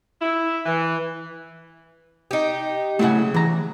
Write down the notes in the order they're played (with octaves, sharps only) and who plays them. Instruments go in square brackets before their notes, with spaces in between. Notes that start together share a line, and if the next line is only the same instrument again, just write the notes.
[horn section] E4
E3
[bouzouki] D#4 G4
[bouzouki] C#3 F#3 [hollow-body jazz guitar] A3 E4 F#5
[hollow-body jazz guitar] E3 A#5